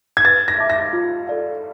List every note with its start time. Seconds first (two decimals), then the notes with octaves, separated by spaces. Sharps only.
0.17 G#6
0.25 B4 A6
0.48 A#6
0.58 E5 A5 D6
0.70 A#6
0.93 F4
1.28 A4 D5 F5